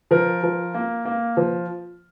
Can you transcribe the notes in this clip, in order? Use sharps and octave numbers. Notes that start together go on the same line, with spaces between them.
F3 A#4
F3
A#3
A#3
F3